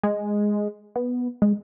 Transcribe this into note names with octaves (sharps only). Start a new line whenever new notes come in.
G#3
B3
G#3